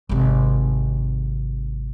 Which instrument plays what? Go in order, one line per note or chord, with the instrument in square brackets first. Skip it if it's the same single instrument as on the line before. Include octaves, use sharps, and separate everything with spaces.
[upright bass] G#1 C3